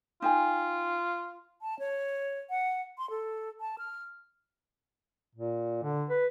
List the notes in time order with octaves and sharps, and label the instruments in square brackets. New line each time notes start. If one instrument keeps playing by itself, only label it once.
[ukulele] D#4 G5 G#5 [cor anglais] F4
[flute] A5
C#5
F#5
C6
A4
A5
F6
[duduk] A#2
D3
B4